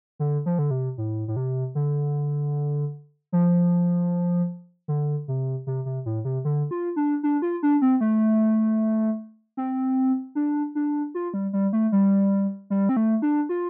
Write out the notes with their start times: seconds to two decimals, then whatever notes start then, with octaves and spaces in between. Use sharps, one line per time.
0.19 D3
0.46 F3
0.59 D3
0.71 C3
0.98 A2
1.28 A2
1.36 C3
1.75 D3
3.33 F3
4.88 D3
5.28 C3
5.67 C3
5.86 C3
6.06 A2
6.25 C3
6.45 D3
6.71 F4
6.96 D4
7.23 D4
7.42 F4
7.63 D4
7.82 C4
8.01 A3
9.57 C4
10.35 D4
10.75 D4
11.15 F4
11.34 G3
11.53 G3
11.73 A3
11.92 G3
12.70 G3
12.89 C4
12.97 A3
13.22 D4
13.49 F4